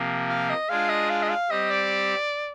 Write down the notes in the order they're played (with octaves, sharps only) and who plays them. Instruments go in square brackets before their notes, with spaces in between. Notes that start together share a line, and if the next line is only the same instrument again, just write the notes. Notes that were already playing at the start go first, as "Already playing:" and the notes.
Already playing: [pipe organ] C3 F3 A#3
[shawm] F5
D#5
[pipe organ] G#3 D4 F4 G#4 [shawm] F5
[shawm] D#5
F5
D#5
F5
[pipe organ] G3 C4 G4 [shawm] D#5
[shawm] D5